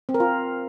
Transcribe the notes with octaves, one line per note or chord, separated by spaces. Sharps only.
C4
A#4
F4